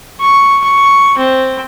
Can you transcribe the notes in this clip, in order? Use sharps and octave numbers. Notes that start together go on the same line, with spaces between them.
C#6
C#6
C4